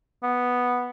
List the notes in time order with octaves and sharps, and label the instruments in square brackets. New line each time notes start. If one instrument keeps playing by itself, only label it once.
[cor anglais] B3